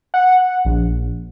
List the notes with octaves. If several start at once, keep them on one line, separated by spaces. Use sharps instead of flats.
F#5
A#1